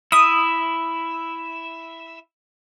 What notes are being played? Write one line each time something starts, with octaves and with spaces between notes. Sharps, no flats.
E4 E5 D#6